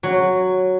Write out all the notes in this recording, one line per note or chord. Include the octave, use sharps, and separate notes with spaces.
F#3